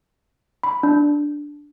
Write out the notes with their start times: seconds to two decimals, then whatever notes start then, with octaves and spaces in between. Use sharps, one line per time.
0.63 B5
0.83 D4